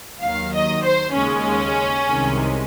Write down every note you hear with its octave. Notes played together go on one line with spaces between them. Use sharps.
D#2 D#3 F#3 F5
D#5
C5
D#2 C#3 G#3 C#4
C2 C3 D#3 G#3